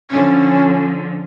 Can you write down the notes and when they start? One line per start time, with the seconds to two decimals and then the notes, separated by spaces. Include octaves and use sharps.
0.11 D3 F3 C#4